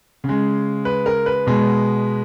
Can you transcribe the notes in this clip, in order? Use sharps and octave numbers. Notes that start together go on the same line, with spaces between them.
C#3
G#3
B4
A#4
B4
B2 G#3